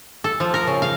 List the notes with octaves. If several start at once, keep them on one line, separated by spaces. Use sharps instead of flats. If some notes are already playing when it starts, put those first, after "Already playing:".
A4
F3
A#4
C#3
F5